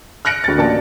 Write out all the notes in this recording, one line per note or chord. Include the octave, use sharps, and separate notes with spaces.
F6 F#6 A#6 C#7 D7
D2 A6
A1 A#3 D5 A5